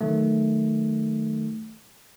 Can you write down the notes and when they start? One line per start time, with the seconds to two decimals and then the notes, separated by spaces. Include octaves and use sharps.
0.01 D#3 F#3 A3